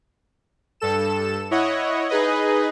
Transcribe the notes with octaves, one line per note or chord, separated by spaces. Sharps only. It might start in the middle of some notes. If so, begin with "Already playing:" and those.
G2 A4 E7
E4 C#5 D#5 F#5
D#4 G#4 B4 D#5